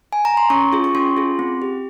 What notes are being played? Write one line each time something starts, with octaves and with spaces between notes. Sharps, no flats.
G#5
A#5
C6
C#4 C#6
F4 G#4
C#6
C#4 C6
F4 G#4
C4
G4